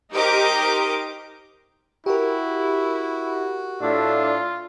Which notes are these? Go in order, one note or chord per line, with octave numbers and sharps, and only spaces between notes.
D#4 G4 A#4 C5 D#5 D6
E4 F#4 G4 A#4
A2 D4 F4 E5